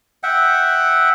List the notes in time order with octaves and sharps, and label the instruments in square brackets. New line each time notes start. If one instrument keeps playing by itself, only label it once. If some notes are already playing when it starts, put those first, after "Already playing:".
[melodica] E5 F#5 G5